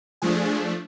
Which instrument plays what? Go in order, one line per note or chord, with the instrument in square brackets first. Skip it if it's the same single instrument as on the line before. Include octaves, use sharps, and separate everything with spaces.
[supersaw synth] F3 G#3 A3 D4 G#4